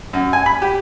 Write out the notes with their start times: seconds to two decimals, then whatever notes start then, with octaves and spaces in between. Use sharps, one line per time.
0.13 F#2
0.33 G#5
0.46 B5
0.62 G4